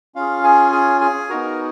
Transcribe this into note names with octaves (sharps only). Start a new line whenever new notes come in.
C#4 F4 G#4 F5
G#4 G#5
G#4 G#5
G#4 G#5
B3 D#4 F#4 A#4 A#5